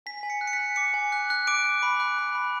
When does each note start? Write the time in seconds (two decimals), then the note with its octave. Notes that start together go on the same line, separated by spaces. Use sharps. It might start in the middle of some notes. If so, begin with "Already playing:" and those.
0.06 G#5 B6
0.23 G#5
0.30 C#7
0.41 F#6
0.47 C#7
0.53 B6
0.59 G#5
0.76 D6 C#7
0.94 G#5
1.12 F#6
1.30 F#6
1.47 D6 D7
1.64 D6
1.83 B5
2.00 F#6
2.19 B5
2.35 B5